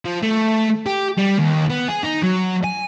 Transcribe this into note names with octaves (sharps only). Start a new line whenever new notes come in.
F3
A3
G4
G3
D#2
B3
G#4
D#4
F#3
G#5